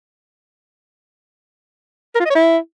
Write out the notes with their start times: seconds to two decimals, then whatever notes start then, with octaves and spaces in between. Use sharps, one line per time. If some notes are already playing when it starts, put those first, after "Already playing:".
2.15 A#4
2.20 F4
2.25 D#5
2.30 C#5
2.35 E4